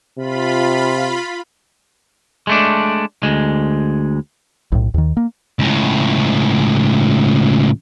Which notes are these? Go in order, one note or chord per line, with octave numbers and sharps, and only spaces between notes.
C3 F4 B5
G#3 A3 D4
D2 G#3
B1 A2
D#2 D#3
A#3
C#2 A2